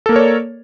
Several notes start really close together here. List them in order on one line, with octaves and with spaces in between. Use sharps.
A4 A#3 A#4 C#5 D5